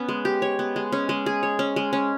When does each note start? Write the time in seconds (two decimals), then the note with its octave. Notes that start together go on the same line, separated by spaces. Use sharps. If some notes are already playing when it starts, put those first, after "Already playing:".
Already playing: B3 C#4
0.09 G#3
0.25 G4
0.42 C#5
0.59 B3
0.76 G#3
0.92 C#4
1.09 G#3
1.26 G#4
1.43 C#5
1.59 C#4
1.76 G#3
1.93 C#4